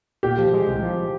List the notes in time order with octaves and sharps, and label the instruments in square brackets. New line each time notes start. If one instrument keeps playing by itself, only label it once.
[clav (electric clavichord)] A#2 [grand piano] G4
[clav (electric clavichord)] F3
G#3
C2
F3